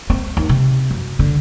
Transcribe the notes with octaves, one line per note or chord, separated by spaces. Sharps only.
C4
D#2
C3
F#2
D3